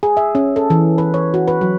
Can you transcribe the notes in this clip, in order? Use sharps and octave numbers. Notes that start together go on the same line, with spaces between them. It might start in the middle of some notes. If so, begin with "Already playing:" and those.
G#4
E5
C#4
A4
E3
B4
C#5
F#4
B4
F#3